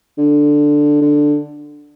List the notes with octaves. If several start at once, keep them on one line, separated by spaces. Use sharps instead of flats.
D3
D3